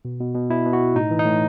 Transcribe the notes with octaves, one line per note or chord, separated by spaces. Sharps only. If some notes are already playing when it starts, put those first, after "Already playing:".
B2
B2
B2
B2 E4
B2
F#4
B2
A2 D#4
E3
D#4
A2